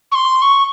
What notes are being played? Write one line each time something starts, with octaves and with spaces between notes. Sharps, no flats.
C#6
C6
C#6